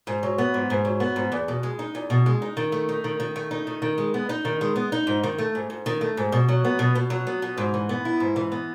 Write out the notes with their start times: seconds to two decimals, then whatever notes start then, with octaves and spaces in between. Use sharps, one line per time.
0.07 G#2
0.23 F#3
0.38 B3
0.54 G#2
0.70 G#2
0.85 F#3
1.00 B3
1.16 G#2
1.32 E2
1.48 B2
1.63 G#3
1.79 D#4
1.95 E2
2.10 B2
2.26 G#3
2.42 D#4
2.57 D#3
2.72 A3
2.89 D#4
3.04 D#3
3.20 D#3
3.36 A3
3.51 D#4
3.67 D#3
3.82 D#3
3.98 G#3
4.14 B3
4.29 D#4
4.45 D#3
4.61 G#3
4.76 B3
4.92 D#4
5.07 G#2
5.23 D#3
5.38 A3
5.55 G#2
5.70 G#2
5.86 D#3
6.01 A3
6.17 G#2
6.32 B2
6.49 F#3
6.64 B3
6.79 B2
6.95 B2
7.10 F#3
7.27 B3
7.42 B2
7.57 G#2
7.74 E3
7.89 B3
8.05 E4
8.20 G#2
8.36 E3
8.52 B3